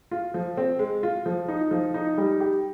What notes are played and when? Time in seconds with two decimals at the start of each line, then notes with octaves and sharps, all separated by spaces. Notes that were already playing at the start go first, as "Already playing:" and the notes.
0.11 F4
0.34 F3
0.57 C4
0.79 G#3
1.03 F4
1.26 F3
1.48 D#4
1.71 F3
1.94 D#4
2.18 G3
2.40 G4